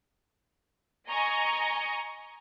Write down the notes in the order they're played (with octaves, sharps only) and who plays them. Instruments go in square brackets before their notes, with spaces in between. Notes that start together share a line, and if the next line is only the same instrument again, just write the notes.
[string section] D#5 G#5 A#5 C#6